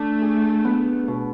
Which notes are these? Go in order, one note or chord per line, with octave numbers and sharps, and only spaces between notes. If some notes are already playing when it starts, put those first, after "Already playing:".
Already playing: A3 D4
G#4
B3
B2